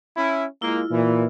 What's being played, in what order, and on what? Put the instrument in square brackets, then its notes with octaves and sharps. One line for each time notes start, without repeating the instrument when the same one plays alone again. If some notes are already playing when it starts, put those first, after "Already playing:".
[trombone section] C#4 E4
[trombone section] G#3 A#3 [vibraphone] E4 F4
[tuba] A#2 [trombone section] E3